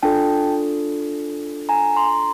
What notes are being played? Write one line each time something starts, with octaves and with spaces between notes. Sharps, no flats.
D4 F4 A4 G5 A5
G#5 A#5
A#5 C6